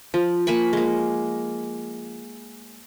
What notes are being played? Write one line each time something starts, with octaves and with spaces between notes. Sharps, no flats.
F3
A#3 G#5 B5 C#6
G#3 A#3